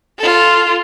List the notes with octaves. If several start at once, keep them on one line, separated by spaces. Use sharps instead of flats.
F4 A4